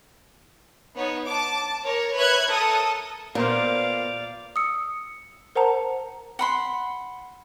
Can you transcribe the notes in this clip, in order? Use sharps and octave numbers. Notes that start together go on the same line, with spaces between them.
B3 D#4 C#5
A5 D6
A#4 C#5
B4 C#5 E5 F#6 G#6
A4 A#4 D#6
A#2 B3 A#4 C5 D5 F5
D#6 E6 C#7
A#4 C5 F#5 A5 A#5
F#5 B5 C6